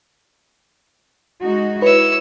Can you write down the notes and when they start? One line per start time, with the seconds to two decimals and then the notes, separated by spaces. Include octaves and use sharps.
1.41 G#3 D#4 F#4
1.82 E4 B4 C#5 E6